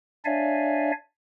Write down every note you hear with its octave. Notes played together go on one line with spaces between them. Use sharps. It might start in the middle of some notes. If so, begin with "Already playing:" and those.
D4 C#5 D5 E5 F5 G#5